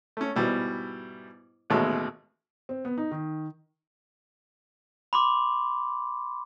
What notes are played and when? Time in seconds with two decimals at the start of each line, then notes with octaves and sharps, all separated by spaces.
0.17 A3 C#4
0.36 G#2 B2 G3 E4
1.70 A1 D#2 B2 G#3 A3 E6
2.69 C4
2.85 B3
2.98 D#4
3.11 D#3
5.13 B5 C6 D6